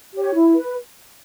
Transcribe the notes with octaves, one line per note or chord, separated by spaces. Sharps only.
G4 C#5
E4
B4